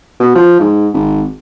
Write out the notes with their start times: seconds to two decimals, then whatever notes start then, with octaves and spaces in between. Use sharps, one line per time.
0.20 B2
0.35 F3
0.60 G#2
0.94 G#1